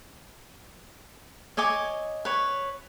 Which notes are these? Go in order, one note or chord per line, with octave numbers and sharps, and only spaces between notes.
C#5 D#5 G#5 D6
B4 C#5